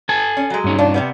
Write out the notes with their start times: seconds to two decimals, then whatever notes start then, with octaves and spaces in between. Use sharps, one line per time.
0.09 A4 G#5 A5
0.37 C#4
0.50 F#3 G#3
0.64 G2 C#4 D#4
0.78 D4 F4
0.94 C3 G3 B3